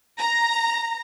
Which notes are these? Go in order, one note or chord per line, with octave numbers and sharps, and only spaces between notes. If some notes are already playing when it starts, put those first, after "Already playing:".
A#5